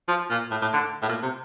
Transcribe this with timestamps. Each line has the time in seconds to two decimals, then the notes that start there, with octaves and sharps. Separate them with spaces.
0.08 F3
0.30 A#2
0.51 A2
0.62 A2
0.73 D3
1.02 A2
1.09 A#2
1.22 C3